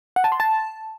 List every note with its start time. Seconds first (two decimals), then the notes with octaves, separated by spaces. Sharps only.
0.16 F#5
0.24 A5
0.32 C6
0.40 A5